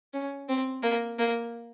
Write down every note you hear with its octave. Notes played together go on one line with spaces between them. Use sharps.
C#4
C4
A#3
A#3